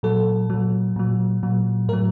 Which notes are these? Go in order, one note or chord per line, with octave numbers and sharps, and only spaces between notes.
A#2 F#3 A4
A#2 F#3
A#2 F#3
A#2 F#3
A2 F#3 A#4